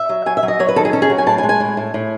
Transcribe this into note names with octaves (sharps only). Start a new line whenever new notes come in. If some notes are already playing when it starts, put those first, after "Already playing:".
Already playing: E5
F#3
F#3 G#5
E5
F#3
D#5
F#3 C#5
B4
D#3 A4
G#4
C#4 A4
G#4
F#3
G#5
A2 A5
G#5
G#3
G#5
A2
A2
A2